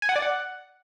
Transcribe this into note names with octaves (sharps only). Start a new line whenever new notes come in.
G#5
F#5
D5
F#5